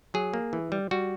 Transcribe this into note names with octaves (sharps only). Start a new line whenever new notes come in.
F#3 G#4
A#3
E3
G3
G3 F#4